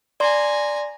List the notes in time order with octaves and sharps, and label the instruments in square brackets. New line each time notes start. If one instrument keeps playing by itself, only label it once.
[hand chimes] D5 C6 [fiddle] G#5 A#5